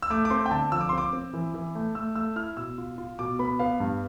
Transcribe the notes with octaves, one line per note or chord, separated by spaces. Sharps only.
E6
A3 D6
D6
C4 C6
G5
D3 A5
F3 E6
D6
C6
C4 D6
C4
E3
E3
A3
A3 E6
A3 E6
E4 F6
B2 E6
F4
F4
B2 D6
B3 B5
B3 F5
G2